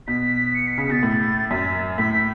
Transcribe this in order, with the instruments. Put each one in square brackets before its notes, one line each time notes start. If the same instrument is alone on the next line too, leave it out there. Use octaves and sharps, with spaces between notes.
[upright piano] B2 [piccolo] B6
[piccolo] C#7
B6
C#7
[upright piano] C#3 [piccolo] B6
[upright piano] B2 [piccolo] A6
[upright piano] A2
[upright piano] F#2 [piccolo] B6
[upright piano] A2 [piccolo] B6